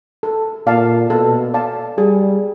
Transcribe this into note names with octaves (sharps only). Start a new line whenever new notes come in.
A4
A#2 D5 F5 A5
B2 A4
D5 F5 A5
G3 G#4